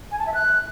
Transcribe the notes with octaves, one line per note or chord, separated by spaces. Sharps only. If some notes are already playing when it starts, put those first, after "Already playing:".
G#5
A5
E5
F#6